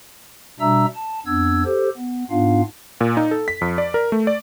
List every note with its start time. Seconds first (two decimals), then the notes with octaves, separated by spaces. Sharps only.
0.60 B2 G3 D4 E5 A#5 E6
0.95 A5
1.26 F2 B3 D4 E6 G#6
1.65 G4 A4 C5
1.97 B3
2.31 G#2 B3 D4 F4 F5
3.01 A#2
3.17 D#4
3.31 A4
3.48 B6
3.61 F2
3.78 D5
3.94 A#4
4.12 A3
4.27 D5